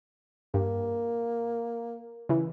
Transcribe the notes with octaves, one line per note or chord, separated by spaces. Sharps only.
G2 A#3
C#3 E3